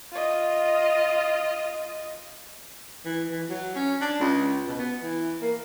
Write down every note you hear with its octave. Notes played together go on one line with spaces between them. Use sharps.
F4 D#5
E3
E3
F#3
C#4
D4
C#2
B2
B3
E3
A#3